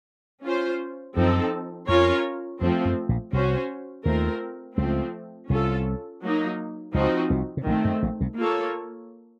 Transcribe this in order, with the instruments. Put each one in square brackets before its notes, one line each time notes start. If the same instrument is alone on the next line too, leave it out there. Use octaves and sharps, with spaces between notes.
[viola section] C#4 F4 C5
[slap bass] F#2 [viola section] F3 C4 D#4 A4
[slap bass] F2 [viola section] C#4 F4 A#4 C#5
[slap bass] F2 [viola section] F3 A3 C4
[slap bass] F#2
A#1 A#2
[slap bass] C2 C3 [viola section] C#4 F#4 C5
[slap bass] D#2 D#3 [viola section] A3 C4 F4 A#4
[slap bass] C#2 C#3 [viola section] F3 A3 C4
[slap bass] C2 C3 [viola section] C#4 F4 A4
[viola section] F#3 A#3 D#4
[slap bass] C#2 C#3 [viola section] F3 C4 D#4 F#4
[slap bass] C2 C3
C3
[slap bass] A#1 A#2 [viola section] D#3 A3 C4
[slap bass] F#2
A#1 A#2
C2 C3
[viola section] A#3 F4 A4 C#5